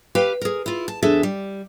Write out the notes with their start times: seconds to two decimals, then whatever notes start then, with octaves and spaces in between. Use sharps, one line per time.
0.15 G4 B4 F5 G5
0.42 G#4 A#4
0.66 E4 F4
0.88 A5
1.03 E2 D4 G#4 A4 E5
1.23 G3